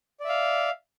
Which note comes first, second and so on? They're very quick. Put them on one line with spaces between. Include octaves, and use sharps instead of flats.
D5 E5 F5